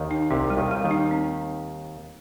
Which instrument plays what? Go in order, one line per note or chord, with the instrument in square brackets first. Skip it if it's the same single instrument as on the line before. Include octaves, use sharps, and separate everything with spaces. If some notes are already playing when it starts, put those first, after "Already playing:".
Already playing: [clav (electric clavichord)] D#2 D#3
[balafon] D#4
[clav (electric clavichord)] C2 C3 [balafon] C4
[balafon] G3
[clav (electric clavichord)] D#2 D#3
[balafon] G3
[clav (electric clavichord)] D#2 D#3
[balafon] D#4
C4